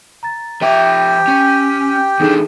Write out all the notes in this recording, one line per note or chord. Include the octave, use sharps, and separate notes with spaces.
A#5 A6
F3 G4 E5 G5
C#4
E2 D4 D#4 G#4 A4